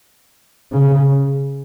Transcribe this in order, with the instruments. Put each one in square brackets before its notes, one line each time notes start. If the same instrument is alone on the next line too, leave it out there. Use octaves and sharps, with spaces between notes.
[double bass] C#3